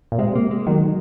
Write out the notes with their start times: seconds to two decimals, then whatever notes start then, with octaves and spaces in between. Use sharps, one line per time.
0.12 A#2
0.18 C3 G#3
0.35 A#3
0.51 G#3
0.67 D#3 F#3